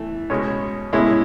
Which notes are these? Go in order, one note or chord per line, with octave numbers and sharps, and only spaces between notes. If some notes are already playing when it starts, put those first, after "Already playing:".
Already playing: E3 A3
B2 G#3 C#4
A2 G#3 C#4 E4